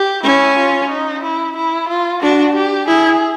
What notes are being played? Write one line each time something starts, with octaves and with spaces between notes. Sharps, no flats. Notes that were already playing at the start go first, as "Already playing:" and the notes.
Already playing: G4
C#4 E4
F4
D#4
E4
E4
F4
D4 F#4
G4
E4 G#4